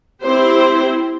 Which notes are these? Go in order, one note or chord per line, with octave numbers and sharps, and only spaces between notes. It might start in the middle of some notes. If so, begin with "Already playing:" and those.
C4 E4 G4 C5